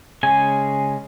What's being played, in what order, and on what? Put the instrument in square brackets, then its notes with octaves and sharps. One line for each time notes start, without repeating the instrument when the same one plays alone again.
[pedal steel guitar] C#3 G#3 C#4 G#5